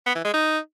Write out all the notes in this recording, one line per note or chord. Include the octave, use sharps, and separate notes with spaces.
B3
E3
G#3
D#4